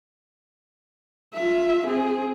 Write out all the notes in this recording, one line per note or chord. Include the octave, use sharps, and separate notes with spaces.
F4 E5
C4 G#4